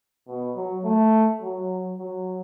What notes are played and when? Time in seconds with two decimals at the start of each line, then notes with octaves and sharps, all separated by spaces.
0.28 B2
0.55 F#3
0.84 A3
1.41 F#3
1.98 F#3